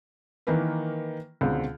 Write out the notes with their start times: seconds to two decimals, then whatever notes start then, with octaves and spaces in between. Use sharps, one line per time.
0.47 D#3 E3 A#3 A#4 B4
1.41 C#2 B2 D3 C4